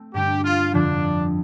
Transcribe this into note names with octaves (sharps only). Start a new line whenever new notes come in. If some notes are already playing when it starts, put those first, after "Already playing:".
Already playing: A3 C4
G2 D3 G3 G4
F4
F2 D3 F3 C4 D4 F4